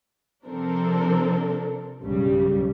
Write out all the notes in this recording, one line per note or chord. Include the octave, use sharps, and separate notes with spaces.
C3 F3 C4 D4 A4 A#4
B1 G2 C#3 G3